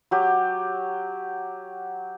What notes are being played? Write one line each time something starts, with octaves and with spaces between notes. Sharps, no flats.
F#3 G4